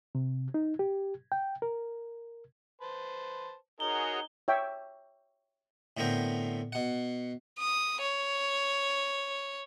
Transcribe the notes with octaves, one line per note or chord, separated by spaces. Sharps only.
C3
D#4
G4
G5
A#4
B4 C5 A5
D#4 F#4 G#4 A#4 C#5 G7
C#5 E5 G5
A2 D3 B3 C4 A#4 G5
B2 F#5
D#6
C#5